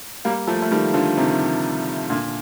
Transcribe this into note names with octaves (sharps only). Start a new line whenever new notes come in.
G3 A#3
F3 A3
A3
D#3 G3
D3 F3
C3 D#3
A#2 D3